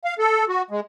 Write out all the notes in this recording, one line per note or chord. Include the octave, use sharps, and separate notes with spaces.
F5
A4
F#4
G#3